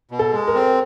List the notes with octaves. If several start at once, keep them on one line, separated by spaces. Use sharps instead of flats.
B2
A4
G#3
A#4
C4